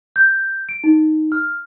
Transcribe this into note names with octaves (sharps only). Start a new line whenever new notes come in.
G6
D7
D#4
F6